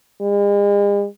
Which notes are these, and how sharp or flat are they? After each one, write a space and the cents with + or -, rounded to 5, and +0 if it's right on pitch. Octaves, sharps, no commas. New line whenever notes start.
G#3 -45